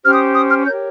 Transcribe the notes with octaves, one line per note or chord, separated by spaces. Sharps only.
C#4 G4 C5 F6
D#6
D#6
F6
G4 A#4 C#5 G6